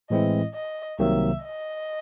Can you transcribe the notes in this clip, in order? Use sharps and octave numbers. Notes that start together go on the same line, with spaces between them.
A2 E3 G#3 C4 E4 D#5
D#5
C2 C3 D#3 F#3 A#3 E5
D#5